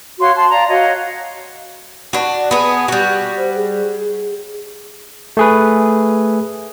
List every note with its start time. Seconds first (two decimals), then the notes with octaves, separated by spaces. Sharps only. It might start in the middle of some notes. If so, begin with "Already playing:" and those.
0.20 F#4 C#5 F5 C6
0.36 A5 C6
0.51 D5 F5 A#5
0.69 F#4 C#5 D#5 F5
2.13 D4 F#4
2.51 B3 G#4
2.88 G3 F#4
3.38 C5
3.56 G#4
5.37 A3 G#4 B4